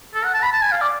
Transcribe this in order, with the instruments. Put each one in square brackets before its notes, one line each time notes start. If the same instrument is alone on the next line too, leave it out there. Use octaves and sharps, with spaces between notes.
[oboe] A4
F#5
A5
B5
A5
G#5
F5
D5